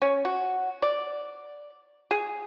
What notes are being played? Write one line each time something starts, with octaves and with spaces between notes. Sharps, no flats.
C#4
F#4
D5
G#4